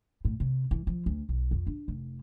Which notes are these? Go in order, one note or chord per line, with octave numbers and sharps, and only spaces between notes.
A2
C3
E3
F3
D2
B1
F2
D4
F1